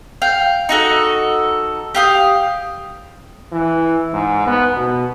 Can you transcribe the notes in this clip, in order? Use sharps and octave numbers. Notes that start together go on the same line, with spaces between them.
F5 G5
D#4 F#4 A4
G4 F5 D#6
E3
G#2
B3
B2